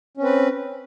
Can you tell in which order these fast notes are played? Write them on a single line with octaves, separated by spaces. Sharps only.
C#4 C4 B4